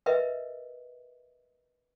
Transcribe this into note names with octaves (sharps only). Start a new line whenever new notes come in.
A#4 B4 D#5 E5